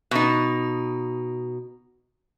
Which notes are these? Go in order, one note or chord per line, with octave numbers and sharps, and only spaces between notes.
B2 D#4